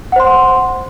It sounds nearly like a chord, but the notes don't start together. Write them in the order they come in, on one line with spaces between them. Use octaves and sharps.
F#5 C5 C6